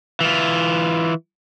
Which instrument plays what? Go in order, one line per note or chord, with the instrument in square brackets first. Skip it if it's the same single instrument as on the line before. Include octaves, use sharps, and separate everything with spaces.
[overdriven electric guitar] E3 F4